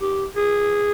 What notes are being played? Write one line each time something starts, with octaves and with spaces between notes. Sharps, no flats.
G4
G#4